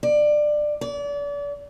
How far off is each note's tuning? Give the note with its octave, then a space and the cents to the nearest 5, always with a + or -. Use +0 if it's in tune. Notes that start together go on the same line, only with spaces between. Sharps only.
D5 +20
D5 -35